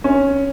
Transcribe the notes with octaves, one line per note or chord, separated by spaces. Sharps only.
C#4